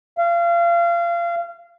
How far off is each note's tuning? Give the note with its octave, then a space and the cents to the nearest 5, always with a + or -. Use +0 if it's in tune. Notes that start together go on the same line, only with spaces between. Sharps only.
F5 -30